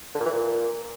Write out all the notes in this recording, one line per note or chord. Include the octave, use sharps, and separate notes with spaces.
D3
A#2
E3
A#2